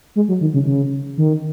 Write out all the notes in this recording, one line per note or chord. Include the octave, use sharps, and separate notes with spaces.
G#3
F#3
D#3
C#3
C#3
D#3